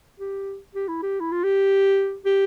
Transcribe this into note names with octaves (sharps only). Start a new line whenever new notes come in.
G4
G4
E4
G4
E4
F4
G4
G4